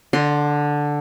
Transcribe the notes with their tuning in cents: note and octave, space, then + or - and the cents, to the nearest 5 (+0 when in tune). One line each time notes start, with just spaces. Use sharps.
D3 +0 D5 +45 C6 +0